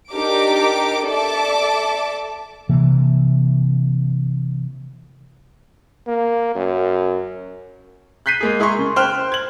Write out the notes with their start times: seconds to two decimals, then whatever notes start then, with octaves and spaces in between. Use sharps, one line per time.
0.11 D4 D#4 G4 A#4 D6 D7
1.06 A4 D5 E5 A5 D6
2.69 C3 E3 A#3
6.07 A#3
6.55 F#2
8.26 F#6 G6 B6 C7 D#7
8.41 G#3 A#3 G#4
8.60 E4 G#4 A#4 C6 C#6
8.79 C#3
8.96 C5 G5 F6 F#6
9.32 G#6 F#7